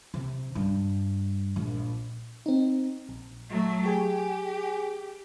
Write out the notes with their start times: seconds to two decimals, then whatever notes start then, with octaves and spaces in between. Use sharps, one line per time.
0.14 C3
0.55 G2
1.56 A#1
2.46 C4 D#4
3.09 A#1
3.49 F#3 A3
3.86 G4 G#4 G#5